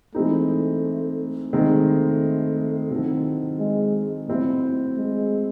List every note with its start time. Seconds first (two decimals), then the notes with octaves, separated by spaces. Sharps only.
0.15 E3 G#3 A3 C4 D#4
1.53 D#3 G#3 A3 C4
2.91 D#3 F#3 C4 E4 A4
3.59 G#3
4.28 A2 F#3 C4 E4
4.97 G#3